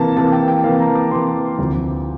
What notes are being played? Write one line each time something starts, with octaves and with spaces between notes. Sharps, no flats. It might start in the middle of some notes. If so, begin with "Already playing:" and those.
Already playing: C3 E3 A#3 A5 A#5
C3 E3 A#3 A5
G5
G5
C3 E3 A#3 F5
A#5
D6
C3 E3 A#3 C6
D2 C3 F3